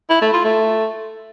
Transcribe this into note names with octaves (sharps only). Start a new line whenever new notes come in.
E4
A3
F4
A3